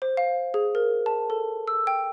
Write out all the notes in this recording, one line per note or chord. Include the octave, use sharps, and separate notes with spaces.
C5
F5
G#4
A#4
A5
A4
E6
G5